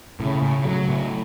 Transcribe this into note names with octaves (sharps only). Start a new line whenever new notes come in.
A2 C#3
A2
F#3
A2